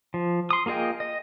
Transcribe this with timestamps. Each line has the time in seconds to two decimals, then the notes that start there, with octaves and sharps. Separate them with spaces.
0.14 F3
0.51 C6 D#6
0.66 A#3 F4 G#4 D#5 G5
1.00 D#5